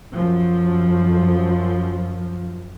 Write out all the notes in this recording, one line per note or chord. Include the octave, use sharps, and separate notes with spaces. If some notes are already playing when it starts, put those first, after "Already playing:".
F#2 F3